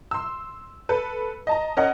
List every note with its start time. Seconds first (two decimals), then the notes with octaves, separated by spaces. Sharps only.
0.11 C6 E6
0.89 A4 B4
1.47 D#5 A5 A#5
1.77 C#4 A#4 D#5 F#5